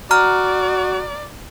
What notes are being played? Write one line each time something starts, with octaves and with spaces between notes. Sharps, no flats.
F#4 D5 A#5 F6